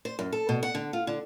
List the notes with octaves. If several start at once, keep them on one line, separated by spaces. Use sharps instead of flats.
C5
F#2
A4
B2
F#5
D3
F4
D3